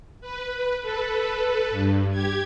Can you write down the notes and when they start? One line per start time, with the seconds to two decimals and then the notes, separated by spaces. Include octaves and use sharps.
0.21 B4
0.82 A4 B4
1.70 G2
2.11 G4 G#6